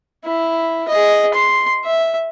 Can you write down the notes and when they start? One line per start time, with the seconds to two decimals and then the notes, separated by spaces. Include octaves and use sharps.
0.25 E4
0.88 G#4 D#5
1.34 C6
1.85 E5